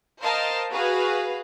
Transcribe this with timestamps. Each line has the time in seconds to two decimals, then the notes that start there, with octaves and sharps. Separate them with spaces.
0.22 A#4 C5 D#5 F5 A5
0.73 F#4 G#4 B4 F5